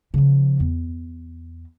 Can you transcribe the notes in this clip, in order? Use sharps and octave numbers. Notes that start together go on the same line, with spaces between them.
C#3 F3
E2